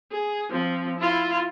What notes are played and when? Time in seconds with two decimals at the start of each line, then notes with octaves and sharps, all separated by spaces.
0.12 G#4
0.51 F3 C4
0.97 E4 F4